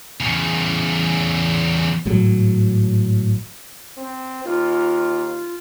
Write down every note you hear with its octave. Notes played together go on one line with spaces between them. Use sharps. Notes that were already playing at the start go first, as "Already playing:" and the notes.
E2 C#3
G#1 A2 F#3
C4
D#2 F4